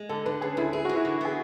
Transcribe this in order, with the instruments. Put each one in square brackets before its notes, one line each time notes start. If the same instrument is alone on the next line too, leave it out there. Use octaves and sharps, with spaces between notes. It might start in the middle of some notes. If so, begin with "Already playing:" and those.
Already playing: [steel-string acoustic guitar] G#3
[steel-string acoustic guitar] D3 [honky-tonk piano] A4
[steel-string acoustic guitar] D3 [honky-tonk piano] B4
[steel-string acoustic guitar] C#3 [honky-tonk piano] G#4
[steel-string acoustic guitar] D2 [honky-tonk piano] E4
[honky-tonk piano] E4 [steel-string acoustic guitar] G#4
[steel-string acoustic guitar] E3 [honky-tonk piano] F#4
[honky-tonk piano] E4
[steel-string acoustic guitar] D3
[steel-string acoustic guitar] B3 [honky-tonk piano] G#4